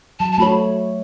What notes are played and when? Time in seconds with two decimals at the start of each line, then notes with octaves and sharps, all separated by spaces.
0.20 F#3 A5
0.32 A5
0.38 A3 F#4 C#5 B5